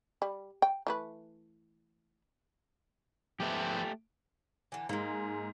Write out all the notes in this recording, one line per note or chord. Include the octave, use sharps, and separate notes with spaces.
G3
G5
E3 A3 B4
F3 A3 B3 G4
D3 E3
G#2 G#3 A#3